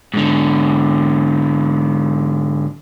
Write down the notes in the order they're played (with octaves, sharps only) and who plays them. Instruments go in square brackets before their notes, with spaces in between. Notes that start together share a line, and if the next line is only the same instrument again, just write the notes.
[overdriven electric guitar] G#2 D3